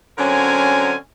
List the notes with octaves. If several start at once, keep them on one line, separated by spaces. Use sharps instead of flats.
D3 F#3 C4 C#4 A#4 G#5